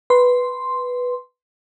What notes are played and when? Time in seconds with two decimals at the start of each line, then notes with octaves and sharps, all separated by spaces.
0.10 B4 C6